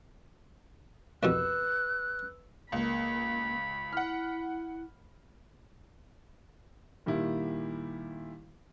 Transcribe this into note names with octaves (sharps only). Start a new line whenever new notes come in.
C2 F2 B2 B4 E6 F#6
C#2 A#3 B5
E4 F#5 F6
A#2 D#3 G3 E4